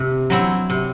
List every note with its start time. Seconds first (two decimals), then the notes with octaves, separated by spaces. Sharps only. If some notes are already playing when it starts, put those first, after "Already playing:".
Already playing: C3
0.30 F#3 C4 E4
0.70 C3